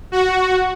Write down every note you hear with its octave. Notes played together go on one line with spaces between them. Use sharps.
F#4